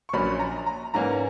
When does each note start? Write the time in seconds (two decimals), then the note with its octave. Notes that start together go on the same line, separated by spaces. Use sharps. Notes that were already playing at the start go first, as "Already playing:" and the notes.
0.09 C#6
0.13 A#1 A#2 F#3 C#4 B5
0.39 A#5
0.66 A#5
0.94 G#2 E3 A#3 C#4 A#5